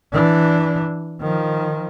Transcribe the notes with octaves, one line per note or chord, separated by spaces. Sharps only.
E3 D4
D#3 F3